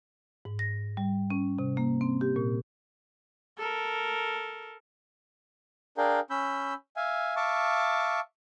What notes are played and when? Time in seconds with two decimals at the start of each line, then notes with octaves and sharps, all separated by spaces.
0.45 G#2
0.59 A#6
0.97 G3
1.30 C#4
1.59 C3
1.77 A#3
2.01 C4
2.21 G4
2.36 A#2
3.58 A4 A#4
5.97 D4 G#4 A#4 F5 G5
6.30 C#4 B5 E6 G6
6.97 E5 F5 G#5
7.36 E5 F5 A5 C#6 D6